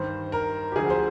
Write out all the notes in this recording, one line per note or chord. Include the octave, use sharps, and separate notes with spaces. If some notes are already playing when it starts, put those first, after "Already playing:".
Already playing: G2 D#3 C5
A#4
G4
D2 D3 F3 G#4
C5